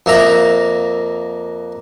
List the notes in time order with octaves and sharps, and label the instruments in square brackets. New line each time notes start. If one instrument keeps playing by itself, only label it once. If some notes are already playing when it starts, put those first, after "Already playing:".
[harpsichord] F2 A#3 E5 A#5